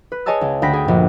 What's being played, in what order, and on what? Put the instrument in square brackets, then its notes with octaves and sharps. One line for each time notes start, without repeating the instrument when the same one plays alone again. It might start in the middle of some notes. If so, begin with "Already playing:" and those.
[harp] B4
G#4 C#5 D#5 G#5 A5 E6
C#2
D2 G5 B5 A#6 B6
G#4 G5
A#1 G2